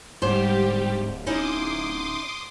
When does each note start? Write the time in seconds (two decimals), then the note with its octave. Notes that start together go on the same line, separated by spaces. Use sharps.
0.22 D1 G#2 G3 G4 C5
1.27 C#4 D#4 E4 C6 D6 D#6